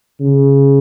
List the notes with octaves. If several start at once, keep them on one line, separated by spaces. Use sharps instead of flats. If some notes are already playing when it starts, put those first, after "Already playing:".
C#3